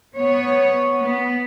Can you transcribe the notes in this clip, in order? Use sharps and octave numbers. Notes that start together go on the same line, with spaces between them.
B3 C#5
B3